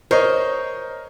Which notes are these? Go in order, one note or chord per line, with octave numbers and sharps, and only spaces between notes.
A#4 C5 C#5 D#5